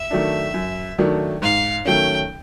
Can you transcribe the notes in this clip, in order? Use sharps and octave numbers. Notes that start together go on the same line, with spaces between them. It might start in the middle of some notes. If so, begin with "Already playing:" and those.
Already playing: E5
D#3 F#3 A3 D4
F#2
D#3 F#3 A3 D4
G#2 F5
D#3 F#3 A3 C#4 G5